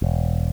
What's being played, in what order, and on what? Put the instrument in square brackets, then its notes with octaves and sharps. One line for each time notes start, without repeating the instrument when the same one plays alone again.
[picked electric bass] E1